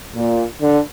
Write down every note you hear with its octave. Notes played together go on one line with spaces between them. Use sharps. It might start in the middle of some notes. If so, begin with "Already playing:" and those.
A#2
D3